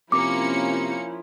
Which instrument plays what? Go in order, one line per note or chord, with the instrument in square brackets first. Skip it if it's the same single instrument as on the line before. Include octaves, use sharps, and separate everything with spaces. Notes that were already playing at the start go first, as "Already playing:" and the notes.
[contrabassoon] C3 [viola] F3 E4 [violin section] A#3 C#4 C#7 [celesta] D6